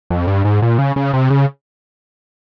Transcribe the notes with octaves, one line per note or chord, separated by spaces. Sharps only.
F2
G2
G#2
A#2
C#3
C#3
C3
C#3